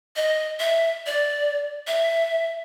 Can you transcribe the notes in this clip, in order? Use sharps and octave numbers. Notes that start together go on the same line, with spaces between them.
D#5
E5
D5
E5